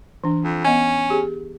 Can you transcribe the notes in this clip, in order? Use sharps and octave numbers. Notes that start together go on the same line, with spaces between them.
E3 D4
F2
B3 C#4 D#5 G#5
G4 G#4